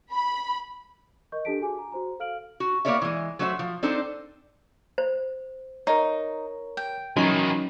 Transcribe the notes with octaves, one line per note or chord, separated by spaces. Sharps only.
B5
A#4 D#5 C#6 G6
D4 G4 A4 A5 B6 D7
F#4 G#4 G#5 D6
A#5
F#4 C5 A#5
A4 F5 F6 D7 F#7
F#4
A#3 B3 A#4 C#5 D5 E5
E3 G#3
F#3 A3 F#4 C5 D#5 E5
F3
C4 D4 D#4 A4 C5
C5
D#4 A#4 C#5
G5
D#3 E3 F#3 C#4 D#4 F#4 G#5 C#6